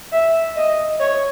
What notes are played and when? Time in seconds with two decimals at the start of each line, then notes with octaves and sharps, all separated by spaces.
0.12 E5
0.56 D#5
1.00 C#5